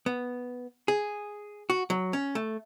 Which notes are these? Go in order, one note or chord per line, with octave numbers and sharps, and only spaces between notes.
B3
G#4
F#4
F#3
C#4
A3